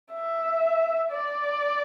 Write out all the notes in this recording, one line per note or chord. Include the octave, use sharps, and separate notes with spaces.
E5
D5